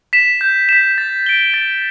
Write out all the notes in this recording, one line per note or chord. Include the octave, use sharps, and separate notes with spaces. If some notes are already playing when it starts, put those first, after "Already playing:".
B6 E7
G6
B6 E7
A6
D7 G7
A6